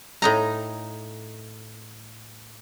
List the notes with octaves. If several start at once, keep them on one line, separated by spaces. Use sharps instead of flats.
A2 D#4 A#5